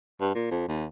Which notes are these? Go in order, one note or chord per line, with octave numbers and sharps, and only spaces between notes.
G2
A#2
F2
D#2